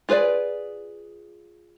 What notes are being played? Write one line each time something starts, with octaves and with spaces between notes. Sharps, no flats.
F4 G#4 B4 C5 D5